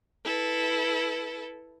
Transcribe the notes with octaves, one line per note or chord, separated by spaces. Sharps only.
E4 A4 B4